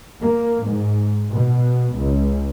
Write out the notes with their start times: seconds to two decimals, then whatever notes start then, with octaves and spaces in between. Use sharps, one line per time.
0.21 A#3
0.65 G#2
1.32 B2
1.96 C#2